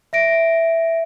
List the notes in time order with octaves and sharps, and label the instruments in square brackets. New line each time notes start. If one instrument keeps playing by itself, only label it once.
[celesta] E5 A#6 D7